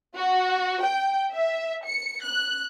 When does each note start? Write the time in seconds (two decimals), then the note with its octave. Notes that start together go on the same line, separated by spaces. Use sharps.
0.17 F#4
0.82 G5
1.31 E5
1.85 C#7
2.24 F#6